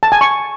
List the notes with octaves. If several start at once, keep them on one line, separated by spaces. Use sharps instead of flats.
A5
G#5
C#6